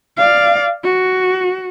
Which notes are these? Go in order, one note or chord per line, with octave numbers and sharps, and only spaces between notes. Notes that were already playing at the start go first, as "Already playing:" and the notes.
D5 F5
F#4